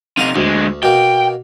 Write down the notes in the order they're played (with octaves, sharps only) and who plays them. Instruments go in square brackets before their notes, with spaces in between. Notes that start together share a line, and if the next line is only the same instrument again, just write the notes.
[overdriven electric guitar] C3 D#4 [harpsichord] F5 F#5 A#5
[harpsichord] D2 [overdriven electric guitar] D3 G#3
[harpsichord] B2 A#3 [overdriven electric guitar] G5